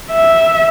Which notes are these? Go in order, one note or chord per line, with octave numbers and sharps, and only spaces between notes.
E5